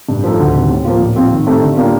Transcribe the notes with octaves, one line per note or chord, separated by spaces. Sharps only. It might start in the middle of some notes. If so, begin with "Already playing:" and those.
G2
F3 A3 D#4 A4
D2
C3 D#3
A2
F3 A#3 F4
A#2
F3 C4 F4
D#3
A3 C4 D#4 G4
D3
G3 A#3 D4 F4